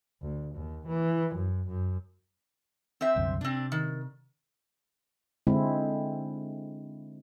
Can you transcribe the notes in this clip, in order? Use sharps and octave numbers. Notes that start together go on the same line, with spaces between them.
D2
D#2
E3
F#2
F#2
C4 C5 E5
C2 F#2 D3
C3 C4 D4
D#3
D3 G#3 C4 E4